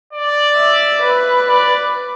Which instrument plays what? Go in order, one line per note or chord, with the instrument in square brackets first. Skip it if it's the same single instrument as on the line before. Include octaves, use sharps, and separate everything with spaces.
[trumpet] D5
[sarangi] E5
B4
[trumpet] D5